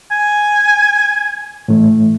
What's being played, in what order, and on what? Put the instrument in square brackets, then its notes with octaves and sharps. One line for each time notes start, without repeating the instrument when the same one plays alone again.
[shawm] G#5
[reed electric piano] A2 E3 A3